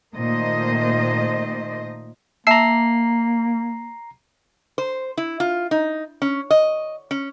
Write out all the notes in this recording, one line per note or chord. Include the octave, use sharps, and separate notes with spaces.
A#2 D#3 A3 C5 D#5
A#3 E5 A5 A#5 E6 C7
C5
E4
F4
D#4
C#4
D#5
C#4